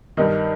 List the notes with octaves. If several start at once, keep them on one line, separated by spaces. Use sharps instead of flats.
G2 D#3 D#4